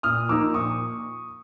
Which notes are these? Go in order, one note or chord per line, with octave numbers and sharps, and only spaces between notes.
A#2 D#6 F6
F3 A#3 D#4 D6 E6
A#2 C#6 D#6